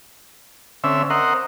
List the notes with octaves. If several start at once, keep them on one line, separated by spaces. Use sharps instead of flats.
D3 C4 C#4 E5
A#4 C5 D#5 F#5